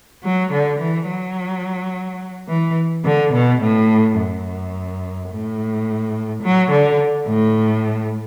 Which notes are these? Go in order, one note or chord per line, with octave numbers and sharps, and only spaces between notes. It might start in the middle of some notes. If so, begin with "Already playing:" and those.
F#3
D3
E3
F#3
E3
D3
B2
A2
F#2
A2
F#3
D3
A2